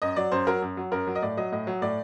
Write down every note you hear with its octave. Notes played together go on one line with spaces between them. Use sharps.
F#2 D#5
F#3 D5
F#2 C5
F#3 A#4
F#2
F#3
F#2 A#4
F#3
D#5
A2 D5
F#3 D#5
A2 D#5
F#3
A2 D5